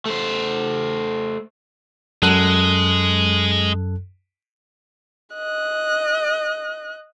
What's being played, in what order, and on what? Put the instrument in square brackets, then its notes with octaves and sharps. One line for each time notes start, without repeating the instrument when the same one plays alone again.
[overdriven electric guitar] A3 C5
[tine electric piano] F#2 A4 F#6 [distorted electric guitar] G#3
[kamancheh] D#5 F#6